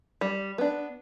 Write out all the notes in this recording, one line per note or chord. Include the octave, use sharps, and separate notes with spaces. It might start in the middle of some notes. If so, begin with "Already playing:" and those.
G3
B3 D4